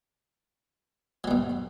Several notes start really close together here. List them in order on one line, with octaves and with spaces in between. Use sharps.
F#3 G3 B2